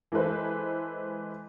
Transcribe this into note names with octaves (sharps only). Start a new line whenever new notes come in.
E3 G#3 A4 B4 C5